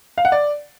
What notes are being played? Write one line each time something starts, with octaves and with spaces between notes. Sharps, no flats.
F5
F#5
D5